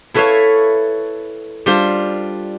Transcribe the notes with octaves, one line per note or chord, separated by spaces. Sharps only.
E4 A4 B4 C#5 E5 F5
G3 D4 F4 C5